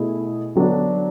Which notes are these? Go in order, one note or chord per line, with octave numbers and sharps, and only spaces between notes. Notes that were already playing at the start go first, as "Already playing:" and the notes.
Already playing: B2 A3 E4 G#4
D3 F#3 B3 D4 F#4